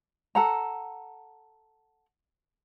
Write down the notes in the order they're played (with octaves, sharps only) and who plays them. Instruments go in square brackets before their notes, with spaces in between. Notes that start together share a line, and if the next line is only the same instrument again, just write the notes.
[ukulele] A4 F#5 A#5